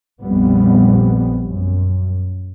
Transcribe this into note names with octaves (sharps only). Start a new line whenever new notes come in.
A#1 F2 G3 B3
F#2